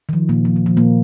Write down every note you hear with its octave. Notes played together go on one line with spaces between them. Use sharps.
D#3
F3
A#2 A#3
F3
D#3
F3
A#2 A#3